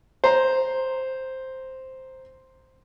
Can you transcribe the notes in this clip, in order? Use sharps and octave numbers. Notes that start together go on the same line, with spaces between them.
C5 A#5